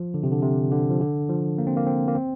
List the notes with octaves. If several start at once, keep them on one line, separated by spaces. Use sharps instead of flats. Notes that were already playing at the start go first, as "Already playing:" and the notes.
Already playing: F3
D3
C3
D3
C3
D3
F3
D3
F3
A#3
C4
A#3
C4
A#3
C4